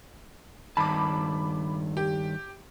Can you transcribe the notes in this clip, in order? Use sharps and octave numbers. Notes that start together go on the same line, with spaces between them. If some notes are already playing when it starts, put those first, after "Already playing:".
G2 D#3 A5 B5 D6
G4